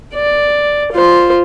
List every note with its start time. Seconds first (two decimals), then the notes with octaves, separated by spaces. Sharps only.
0.15 D5
0.92 F4 C5